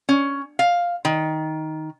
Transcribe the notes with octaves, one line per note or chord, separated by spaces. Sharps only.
C#4
F5
D#3